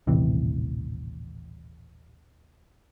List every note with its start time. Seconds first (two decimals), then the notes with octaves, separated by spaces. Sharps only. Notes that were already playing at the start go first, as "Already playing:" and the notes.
0.07 D#1 A1 C3 E3